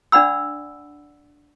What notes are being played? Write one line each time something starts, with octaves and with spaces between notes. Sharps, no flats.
D4 D5 F#5 B5 E6